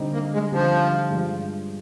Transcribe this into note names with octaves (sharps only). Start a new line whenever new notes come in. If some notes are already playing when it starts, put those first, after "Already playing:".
Already playing: D3 G3 C4 D#4 G4
A#3
G#3
D3 F3 G3 C4 D#4 G4
G2 F3 G#3 D4 G4